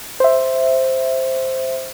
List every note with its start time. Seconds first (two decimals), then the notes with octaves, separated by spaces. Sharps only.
0.20 C5 E5